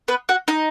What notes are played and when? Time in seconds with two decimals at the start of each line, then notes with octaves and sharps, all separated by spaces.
0.08 B3 B4
0.29 F#4 F#5
0.48 D#4 D#5